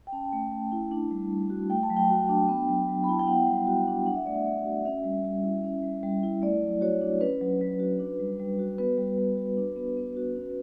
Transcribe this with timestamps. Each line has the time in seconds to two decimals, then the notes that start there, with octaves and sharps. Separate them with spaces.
0.07 G5
0.12 C#4 A5
0.33 A3
0.52 A3
0.72 E4
0.91 D4
1.11 G3
1.31 G3
1.50 F#4
1.70 A3 G5
1.83 A5
1.90 F#3
1.97 G5
2.10 F#4
2.29 D4
2.49 B3
2.69 F#3
2.89 F#3
3.04 B5
3.09 E4 A5
3.19 G5
3.27 B3 F#5
3.47 G3
3.67 F#4
3.87 D4
4.06 D4 F#5
4.16 E5
4.25 A3 D5
4.35 E5
4.46 A3
4.65 F#4
4.85 C#4 E5
5.04 G3
5.24 G3
5.44 E4
5.64 C#4
5.83 G3
6.03 G3
6.23 E4
6.42 A3 D5
6.62 F#3
6.81 F#4 C#5
7.01 D4
7.21 C#4 B4
7.41 F#3
7.61 F#3
7.80 F#4
7.99 D4
8.19 G3
8.40 G3
8.59 F#4
8.78 B3 B4
8.98 G3
9.18 G3
9.37 F#4
9.57 D4
9.76 B3
9.97 B3
10.17 F#4
10.36 C#4